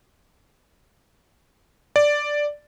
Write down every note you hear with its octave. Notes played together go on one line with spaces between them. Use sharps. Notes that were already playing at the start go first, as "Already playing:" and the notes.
D5